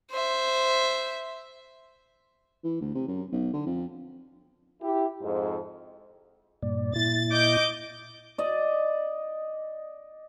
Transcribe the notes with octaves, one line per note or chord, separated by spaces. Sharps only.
C5 E5
E3
D2
C3
F#2
B1
D3
F2
E4 G4
F2 G#2
G2 A#2 D5
A#2 E4 A6
D#5 D6 G6
D5 D#5